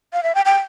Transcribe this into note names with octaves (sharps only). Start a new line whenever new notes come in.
F5
E5
G5
G5